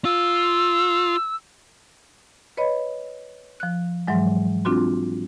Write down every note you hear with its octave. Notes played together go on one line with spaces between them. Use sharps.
F4 E6
B4 C#5 D#5 B5
F3 F#6
G#2 E3 F#3 G#3
C4 D4 F4 F#4 C6